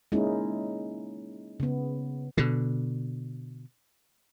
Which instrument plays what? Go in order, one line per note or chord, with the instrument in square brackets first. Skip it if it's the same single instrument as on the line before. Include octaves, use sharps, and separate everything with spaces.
[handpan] G#3 A#3 C#4 D#4 E4
C#3 B3
[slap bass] B2 D3